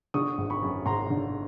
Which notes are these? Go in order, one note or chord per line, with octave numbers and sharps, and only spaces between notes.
D3 C#6 D#6
G#1
B5 C#6
F#2
G#1 A#5 C6
D3